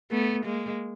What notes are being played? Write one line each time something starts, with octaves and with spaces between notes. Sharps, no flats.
A3 B3
G#3 A#3